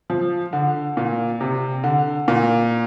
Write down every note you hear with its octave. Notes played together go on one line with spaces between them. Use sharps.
F3
D3
A#2
C3
D3
A#2